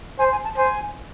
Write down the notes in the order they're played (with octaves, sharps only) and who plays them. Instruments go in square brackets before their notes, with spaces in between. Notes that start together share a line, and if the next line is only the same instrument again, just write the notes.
[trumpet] C5 [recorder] G#5
[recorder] G#5
A5
[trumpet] C5 [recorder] G#5